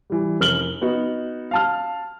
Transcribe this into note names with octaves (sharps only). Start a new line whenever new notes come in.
E3 G3
F1 A#4 F6 F#7 G7
B3 D#4 F#4
F5 A5 F6